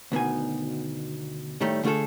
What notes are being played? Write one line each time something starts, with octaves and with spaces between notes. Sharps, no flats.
D2 B2 D#3 G#5
A2 D#3 G3 A3
D3 A3 F4 G#4 A4